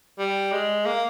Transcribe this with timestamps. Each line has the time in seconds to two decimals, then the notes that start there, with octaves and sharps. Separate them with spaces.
0.19 G3
0.52 G#3
0.85 A#3